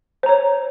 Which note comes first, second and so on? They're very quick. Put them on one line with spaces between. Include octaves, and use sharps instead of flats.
C5 A#5 C#5